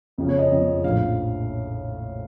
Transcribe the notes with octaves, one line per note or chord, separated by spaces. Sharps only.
F#1 F2 C#3 F3
C#5
D#5
F#1 F2 C#3 F3
A#1 A2 F3 F5